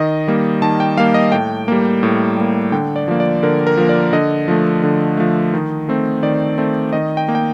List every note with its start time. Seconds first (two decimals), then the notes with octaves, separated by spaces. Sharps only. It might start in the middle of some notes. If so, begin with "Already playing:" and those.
Already playing: D#3 D#5
0.28 G3 A#3
0.62 D#3 A5
0.80 G5
0.97 G3 A#3 F5
1.14 D#5
1.32 A2 G5
1.68 G3 A#3
2.03 A2
2.37 G3 A#3
2.72 D3 G5
2.96 D5
3.08 F3 A#3
3.20 D5
3.43 D3 A#4
3.67 A#4
3.77 F3 A#3
3.89 D5
4.13 D3 D#5
4.48 F3 A3
4.83 D3
5.17 F3 A3
5.54 D#3
5.89 A3 C4
6.22 D#3 D5
6.58 A3 C4
6.93 D#3 D#5
7.17 G5
7.28 A#3
7.35 G5